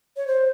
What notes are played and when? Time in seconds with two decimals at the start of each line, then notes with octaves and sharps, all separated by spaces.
0.17 C#5
0.27 C5